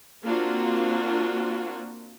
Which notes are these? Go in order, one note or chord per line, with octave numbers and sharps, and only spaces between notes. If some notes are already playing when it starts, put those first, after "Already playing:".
A#3 C4 D4 F4 F#4